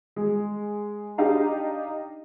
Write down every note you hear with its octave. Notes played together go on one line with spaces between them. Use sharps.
G#3
D4 D#4 G4 D#5 F5 A#5